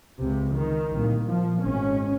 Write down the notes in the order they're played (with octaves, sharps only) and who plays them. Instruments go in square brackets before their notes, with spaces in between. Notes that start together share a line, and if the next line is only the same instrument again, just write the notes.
[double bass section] C#2 C3
D#3
C2 A#2
F3
G#1 G#2 C#4